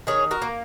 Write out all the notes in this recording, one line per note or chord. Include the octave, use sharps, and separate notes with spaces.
D#3 G#4 C#5
F#4 A#4
A#3